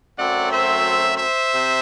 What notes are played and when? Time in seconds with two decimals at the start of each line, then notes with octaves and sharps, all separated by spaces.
0.19 F#2 F#3 A3 C4 D5 F#5
0.52 C5 E5
1.18 C5 E5
1.51 C3